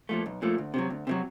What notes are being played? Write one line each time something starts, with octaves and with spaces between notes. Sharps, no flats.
A#2 F3 A3
B1
A#2 F3 A3
D2
C3 D#3 F#3
D2
C3 D#3 F#3